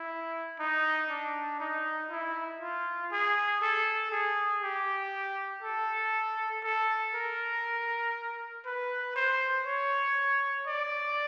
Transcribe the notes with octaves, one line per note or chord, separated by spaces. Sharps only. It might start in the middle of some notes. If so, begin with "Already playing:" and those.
Already playing: E4
D#4
D4
D#4
E4
F4
G#4
A4
G#4
G4
A4
A4
A#4
B4
C5
C#5
D5